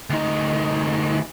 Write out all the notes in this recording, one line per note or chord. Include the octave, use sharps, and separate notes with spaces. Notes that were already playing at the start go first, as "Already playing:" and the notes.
D2 D#4